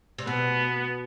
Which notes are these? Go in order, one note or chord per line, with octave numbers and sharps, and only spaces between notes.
C3
B2 B3